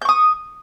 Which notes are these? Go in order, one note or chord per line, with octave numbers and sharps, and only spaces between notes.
C#6 D#6 G6